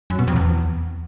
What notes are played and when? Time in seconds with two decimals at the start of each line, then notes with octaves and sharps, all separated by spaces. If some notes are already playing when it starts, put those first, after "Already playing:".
0.10 F#2
0.19 B2
0.27 F2
0.36 E2